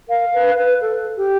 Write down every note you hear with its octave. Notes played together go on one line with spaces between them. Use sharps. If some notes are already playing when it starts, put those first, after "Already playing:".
A#4 F5
B4
B4
A4
G4